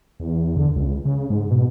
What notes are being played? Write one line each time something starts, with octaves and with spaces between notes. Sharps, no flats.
E2
D3
C#2
C#3
G#2
B2